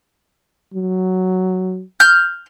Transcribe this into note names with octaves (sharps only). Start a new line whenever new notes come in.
F#3
F6 G6